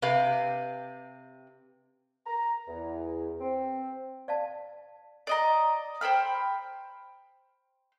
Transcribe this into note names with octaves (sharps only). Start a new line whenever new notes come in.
C3 G4 B4 F5
A#5
E2
C4
D5 F5 A5
D5 D#5 A#5
C5 G5 B5 F6